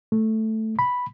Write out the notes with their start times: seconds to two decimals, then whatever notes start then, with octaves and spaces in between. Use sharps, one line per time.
0.12 A3
0.79 B5